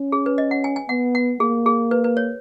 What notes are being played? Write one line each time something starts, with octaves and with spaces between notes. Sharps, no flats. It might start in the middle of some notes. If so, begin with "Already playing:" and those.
Already playing: C#4
G#4
B4
D#5
F#5
G#5
G#5
B3 F#5
F#5
A#3 G#4
G#4
B4
B4
C#5